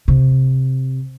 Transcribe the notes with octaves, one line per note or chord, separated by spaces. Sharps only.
C3